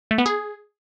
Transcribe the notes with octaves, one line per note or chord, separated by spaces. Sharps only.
A3
B3
G#4